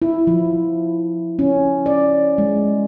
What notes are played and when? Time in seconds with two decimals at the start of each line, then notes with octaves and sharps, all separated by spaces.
0.02 E4
0.27 F3
1.39 C#4
1.86 D5
2.38 G#3